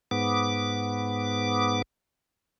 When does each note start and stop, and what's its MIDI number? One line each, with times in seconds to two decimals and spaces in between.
0.11 1.82 44
0.11 1.82 59
0.11 1.82 86